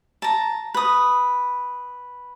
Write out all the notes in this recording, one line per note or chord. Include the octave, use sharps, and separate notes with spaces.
A5 A#5
B4 D#6